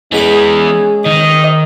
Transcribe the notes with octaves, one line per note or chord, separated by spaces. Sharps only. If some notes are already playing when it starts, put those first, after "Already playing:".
E3 G#3 B3 C#4 G#4 A#5 D6
D#3 D#5